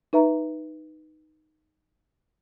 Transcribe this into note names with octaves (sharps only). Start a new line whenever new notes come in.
D#4 B4 E5 A#5